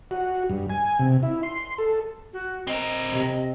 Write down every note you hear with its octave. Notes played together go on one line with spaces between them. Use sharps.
F#4
G2
G#5
C3
E4
C6
A4
F#4
C4 A#4 D#5
C3